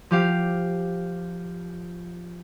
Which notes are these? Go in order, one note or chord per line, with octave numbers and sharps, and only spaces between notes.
F3 G4 F5